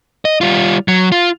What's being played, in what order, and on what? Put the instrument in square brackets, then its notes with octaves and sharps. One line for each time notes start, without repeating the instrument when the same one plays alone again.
[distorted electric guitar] D#5
G3 F4
F#3
F4